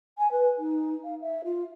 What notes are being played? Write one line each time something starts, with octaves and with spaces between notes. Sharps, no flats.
G#5
B4
D#4
F5
E5
F4